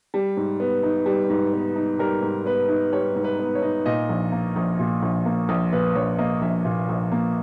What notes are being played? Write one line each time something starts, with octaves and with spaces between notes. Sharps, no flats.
G3
G#2
B3
D#4
G3
G#2
B3
D#4
G3 A#4
G#2
B3 B4
D#4
G3 C#5
G#2
B4
B3
C#5
D#4
A#2 D#5
A#1
A#3
A#1
A#2
A#1
A#3
A#1
A#2 B4
A#1 C#5
A#3 D#5
A#1 E5
A#2
A#1
A#3